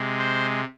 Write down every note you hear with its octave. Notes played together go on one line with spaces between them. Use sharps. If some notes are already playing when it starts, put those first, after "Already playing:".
Already playing: C3 G#3
C5